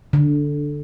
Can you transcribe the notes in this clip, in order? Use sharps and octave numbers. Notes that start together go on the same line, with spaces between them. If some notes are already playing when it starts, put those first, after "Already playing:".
D3